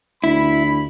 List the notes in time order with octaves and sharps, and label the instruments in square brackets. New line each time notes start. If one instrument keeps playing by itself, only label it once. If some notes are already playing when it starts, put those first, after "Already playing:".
[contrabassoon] D2 [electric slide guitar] E4 [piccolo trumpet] B5